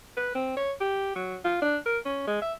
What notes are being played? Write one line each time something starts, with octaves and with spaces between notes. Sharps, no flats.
B4
C4
C#5
G4
F#3
F4
D4
A#4
C#4
G#3
E5